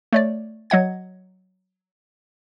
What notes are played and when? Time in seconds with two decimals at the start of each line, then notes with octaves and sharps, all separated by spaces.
0.13 A3 C#5 D5
0.70 F#3 D#5 F#5 G#6